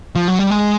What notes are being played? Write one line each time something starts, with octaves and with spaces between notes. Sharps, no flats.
F3
F#3
G3
G#3